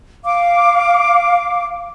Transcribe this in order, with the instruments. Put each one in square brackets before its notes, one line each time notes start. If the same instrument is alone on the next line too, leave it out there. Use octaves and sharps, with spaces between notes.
[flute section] F5 D6